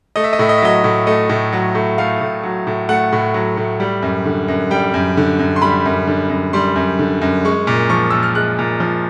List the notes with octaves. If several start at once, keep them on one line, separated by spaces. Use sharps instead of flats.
A3 D#5
E5
D#5
A2 E5
D#5
E5
F#3 D#5
A2
A3 D#5
A2
F#3
A2
A3 F5
A2
F#3
A2
A3 F#5
A2
F#3
A2
G3
F#2
D3
F#2
G3 G5
F#2
D3
F#2
C6
G3 B5
F#2
D3
F#2
G3 C6
F#2
D3
F#2
G#3 C#6
A#2
F3 C#6
A#2 E6
F6
G#3 F#6
A#2
F3